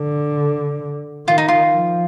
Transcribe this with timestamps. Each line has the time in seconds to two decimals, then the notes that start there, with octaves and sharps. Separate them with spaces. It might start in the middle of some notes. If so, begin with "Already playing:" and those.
Already playing: D3
1.27 D#3 F4
1.38 D#4
1.48 F4
1.73 F3